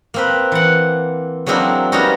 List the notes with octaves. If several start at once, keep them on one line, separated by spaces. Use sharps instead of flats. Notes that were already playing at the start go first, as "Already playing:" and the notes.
A#3 C4 B4
E3 F#5
F#3 G#3 A#3 C4 D4 E4
G3 A#3 B3 C#4 D#4 F#4